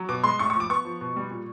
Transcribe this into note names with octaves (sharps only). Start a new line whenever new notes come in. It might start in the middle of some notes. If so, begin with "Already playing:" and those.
Already playing: F#3
B2 D6
G#3 C6
A2 C#6
C#6
F3 D6
B3 C#6
F3
B2
G3
A#2